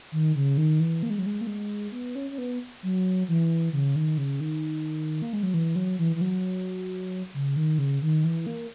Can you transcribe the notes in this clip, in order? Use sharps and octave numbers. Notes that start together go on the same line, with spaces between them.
D#3
C#3
D#3
E3
A#3
G#3
F#3
G#3
A#3
G#3
B3
C#4
C#4
B3
F#3
E3
C#3
D#3
C#3
D#3
A#3
G#3
F#3
E3
F#3
E3
E3
F#3
C#3
D#3
C#3
D#3
E3
A#3